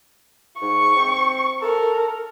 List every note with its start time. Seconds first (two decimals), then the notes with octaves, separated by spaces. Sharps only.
0.62 G#2 C#6
0.96 C4
1.62 A4 A#4